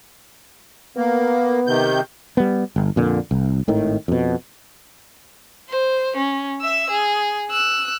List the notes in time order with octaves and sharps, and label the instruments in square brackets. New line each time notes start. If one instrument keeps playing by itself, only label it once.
[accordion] A#3 [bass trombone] B3
[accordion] C3 D#3 G6
[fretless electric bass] G3 B3
G1
F2 A#2 D3
C2
G#1 A2 D#3
F2 B2
[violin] C5
C#4
E5 E6
G#4
E6 F#6